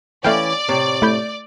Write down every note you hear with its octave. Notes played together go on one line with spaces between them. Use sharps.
E3 A3 C#4 D5 F5 G5
A2 C3
A3 E4 G6